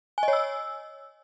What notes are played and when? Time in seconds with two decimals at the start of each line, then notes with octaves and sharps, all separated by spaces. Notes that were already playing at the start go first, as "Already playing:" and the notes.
0.18 G#5
0.23 D#5
0.28 C#5
0.33 E6